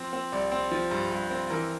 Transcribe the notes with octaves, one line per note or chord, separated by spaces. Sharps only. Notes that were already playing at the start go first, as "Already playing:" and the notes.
Already playing: F3 C4
C4
C2 D5
C4
F3
G2
G2
C4
E3 A#4